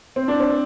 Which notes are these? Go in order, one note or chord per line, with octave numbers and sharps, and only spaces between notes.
C4
D4
C4